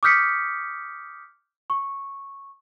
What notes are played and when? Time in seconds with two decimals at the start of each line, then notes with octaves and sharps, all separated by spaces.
0.03 D6 D#6 F6 G6 B6 C#7
1.70 C#6